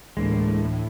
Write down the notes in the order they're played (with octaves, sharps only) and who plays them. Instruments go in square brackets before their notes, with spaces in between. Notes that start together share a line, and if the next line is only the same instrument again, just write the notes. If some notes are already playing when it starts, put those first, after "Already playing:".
[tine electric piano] D2 E3 D4 [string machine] A2 [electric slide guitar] G#3 A#3